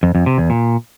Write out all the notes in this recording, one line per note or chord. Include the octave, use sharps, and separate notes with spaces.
F2
F2
C3
E2
A#2